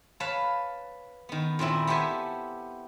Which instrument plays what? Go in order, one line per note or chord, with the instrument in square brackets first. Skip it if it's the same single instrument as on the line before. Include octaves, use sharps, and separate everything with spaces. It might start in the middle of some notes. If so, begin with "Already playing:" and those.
[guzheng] B4 C#5 F5 A5
D#3 B3
A#2 D#3 C4 E4
B3 G4 A4 C5 E5 G#5